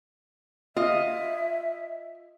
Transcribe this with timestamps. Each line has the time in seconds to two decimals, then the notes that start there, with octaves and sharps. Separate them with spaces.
0.77 F4 D#5 E5